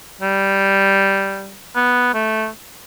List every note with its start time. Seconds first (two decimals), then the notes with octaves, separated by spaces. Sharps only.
0.21 G3
1.76 B3
2.14 A3